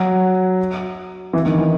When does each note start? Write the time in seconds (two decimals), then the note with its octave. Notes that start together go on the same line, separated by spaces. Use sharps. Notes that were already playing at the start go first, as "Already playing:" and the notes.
Already playing: F#3
1.33 E3
1.46 D#3
1.58 E3